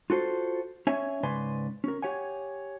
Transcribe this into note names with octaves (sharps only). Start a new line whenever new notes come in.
F4 F#4 A4 C5
C#4 C#5 E5 G#5
G#2 C#3 B4 D5 G#5 C6
C#4 A#4
G4 C#5 F#5 G#5